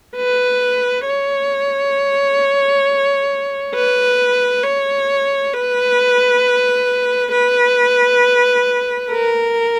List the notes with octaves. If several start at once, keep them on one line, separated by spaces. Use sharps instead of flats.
B4
C#5
B4
C#5
B4
B4
A#4